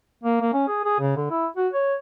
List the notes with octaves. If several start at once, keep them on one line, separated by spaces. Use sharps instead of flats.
A#3
A#3
C#4
G#4
G#4
C#3
D3
E4
F#4
C#5